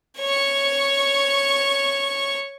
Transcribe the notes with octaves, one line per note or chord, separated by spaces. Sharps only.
C#5 C#6